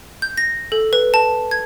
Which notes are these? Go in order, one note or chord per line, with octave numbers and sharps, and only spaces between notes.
G6
A#6
A4
B4
A5
G#6